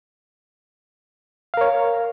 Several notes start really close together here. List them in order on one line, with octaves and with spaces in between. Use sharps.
F5 A#4 C#5